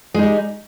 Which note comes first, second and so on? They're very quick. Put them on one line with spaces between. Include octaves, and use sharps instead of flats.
G#3 D#4 G3